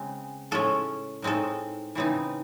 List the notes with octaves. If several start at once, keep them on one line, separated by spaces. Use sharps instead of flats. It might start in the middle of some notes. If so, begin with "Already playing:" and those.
Already playing: C#3 G#3 C4
A2 G#3 C#4 A4
A2 G#3 C4 D#4 A4
C#3 E3 C4 D#4